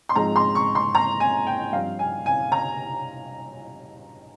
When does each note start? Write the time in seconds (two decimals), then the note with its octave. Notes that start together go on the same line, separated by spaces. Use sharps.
0.09 C6
0.16 G#2 F3 G#3 C4 A#5
0.36 C6
0.55 C#6
0.75 C6
0.95 A#5
1.20 G#5
1.47 G5
1.72 G2 F3 C4 F5
1.99 G#5
2.26 G#5
2.52 A#5